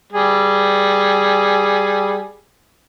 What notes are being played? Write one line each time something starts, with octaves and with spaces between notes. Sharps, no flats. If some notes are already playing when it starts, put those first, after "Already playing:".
G3 G#4